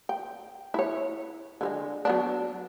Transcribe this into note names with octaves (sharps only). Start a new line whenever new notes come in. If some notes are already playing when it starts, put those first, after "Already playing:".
G5
E4 C#5
D3 G3 G#3
F#3 B3 D4